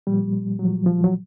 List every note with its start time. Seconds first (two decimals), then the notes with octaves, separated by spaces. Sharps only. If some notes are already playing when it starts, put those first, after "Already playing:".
0.07 A#2 F3 G3
0.59 A#2 F3 F#3
0.86 F3
1.04 F#3